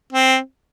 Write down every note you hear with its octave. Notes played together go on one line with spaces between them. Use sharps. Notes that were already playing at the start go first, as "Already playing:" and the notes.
C4